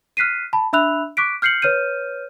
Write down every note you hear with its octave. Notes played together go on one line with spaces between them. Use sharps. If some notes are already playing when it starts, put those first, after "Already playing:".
F6 F#6 B6 C7 D#7
A5 B5
D4 E5 B5 E6 F#6 F7
C#6 D6 F#6 B6 D7
F6 G6 C7 C#7 F#7
B4 C#5 F6 G6 D#7